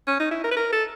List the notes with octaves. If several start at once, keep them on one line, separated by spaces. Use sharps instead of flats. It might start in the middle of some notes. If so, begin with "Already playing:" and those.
C#4
D#4
E4
A#4
B4
A#4
A4